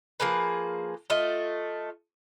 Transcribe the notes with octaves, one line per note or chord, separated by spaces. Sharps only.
F3 A#3 G#4 B4
A3 F4 D#5